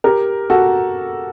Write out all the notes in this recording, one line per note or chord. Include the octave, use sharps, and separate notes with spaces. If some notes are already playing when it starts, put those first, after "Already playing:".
G4 A#4
F#4 A4